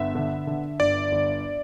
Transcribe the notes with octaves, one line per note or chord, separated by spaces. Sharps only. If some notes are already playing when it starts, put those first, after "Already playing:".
Already playing: G1 B3 E5
D3
D3
G1 D5
G1